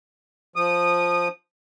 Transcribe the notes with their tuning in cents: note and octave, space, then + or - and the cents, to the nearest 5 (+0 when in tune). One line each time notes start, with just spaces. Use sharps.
F3 +0 D#6 -20